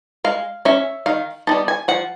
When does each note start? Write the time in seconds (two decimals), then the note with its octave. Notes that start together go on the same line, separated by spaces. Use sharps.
0.24 G#3 F5
0.65 C#4 E5
1.06 D#3 F5
1.47 G3 B3 D#4 A5
1.68 G#5
1.88 F3 F#5